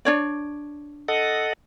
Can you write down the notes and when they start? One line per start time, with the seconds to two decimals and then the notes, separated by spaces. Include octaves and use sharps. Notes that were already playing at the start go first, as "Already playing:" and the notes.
0.05 D4 C#5 D5
1.08 A4 D#5 F#5